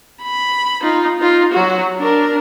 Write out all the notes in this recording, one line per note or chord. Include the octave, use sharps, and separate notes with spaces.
B5
D#4 F4
D#4 F4
F#3 F#4
D4 A#4